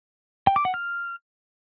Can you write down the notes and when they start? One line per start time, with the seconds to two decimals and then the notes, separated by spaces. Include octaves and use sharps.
0.47 G5
0.56 D6
0.65 F#5
0.74 F6